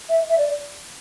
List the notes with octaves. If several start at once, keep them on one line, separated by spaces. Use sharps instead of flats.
E5
E5
D5